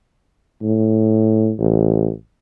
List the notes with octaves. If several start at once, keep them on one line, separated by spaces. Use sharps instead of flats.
A2
A1